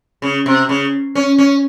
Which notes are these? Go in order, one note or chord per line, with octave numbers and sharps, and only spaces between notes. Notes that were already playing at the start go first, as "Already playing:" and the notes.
C#3
C3
C#3
C#4
C#4